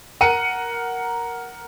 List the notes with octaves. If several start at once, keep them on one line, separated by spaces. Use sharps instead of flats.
A#4 F#5 A#5 C#7 D#7